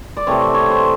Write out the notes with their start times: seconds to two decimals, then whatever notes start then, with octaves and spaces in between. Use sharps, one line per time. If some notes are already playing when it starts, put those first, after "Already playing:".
0.17 D5
0.27 C3 E3 A3 C4 C#5
0.54 C#5
0.70 C5